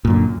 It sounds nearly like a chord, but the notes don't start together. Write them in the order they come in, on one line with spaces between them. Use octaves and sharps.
A#2 F#2 D3